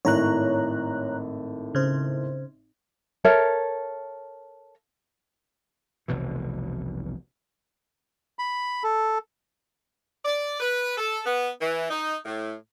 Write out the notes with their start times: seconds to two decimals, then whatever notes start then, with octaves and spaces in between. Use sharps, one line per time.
0.05 G#1 A2 C#5 A#5 F#6
1.75 C#3 C5
3.25 A4 A#4 C#5 E5
6.08 F1 C2 B2 E3
8.39 B5
8.83 A4
10.25 D5
10.60 B4
10.97 A4
11.26 B3
11.61 E3
11.90 D#4
12.25 A2